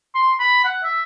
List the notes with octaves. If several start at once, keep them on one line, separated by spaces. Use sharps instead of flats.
C6
B5
F#5
E5